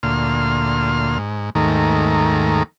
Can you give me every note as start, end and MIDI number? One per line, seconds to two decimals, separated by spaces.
0.03 1.18 38
0.03 1.18 46
0.03 1.18 84
0.03 1.18 89
1.19 1.50 44
1.55 2.63 39
1.55 2.63 44
1.55 2.63 51
1.55 2.63 57
1.55 2.63 82